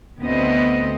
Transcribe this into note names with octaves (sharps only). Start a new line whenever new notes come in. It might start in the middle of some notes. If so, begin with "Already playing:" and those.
D2 B3 C4 D#5